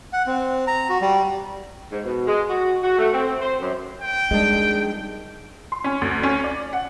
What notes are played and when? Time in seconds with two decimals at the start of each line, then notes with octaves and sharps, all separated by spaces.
0.13 F#5
0.26 C4
0.67 A#5
0.90 F#4
1.01 G3
1.92 G#2
2.04 B2
2.27 G#3
2.49 F#4
2.82 F#4
2.98 A3
3.13 C4
3.41 C5
3.60 F#2
4.01 G5
4.31 F2 D#3 G3 G#3 D4
5.72 C6
5.84 C#4
6.01 D2
6.23 C#4
6.44 D5
6.73 F#5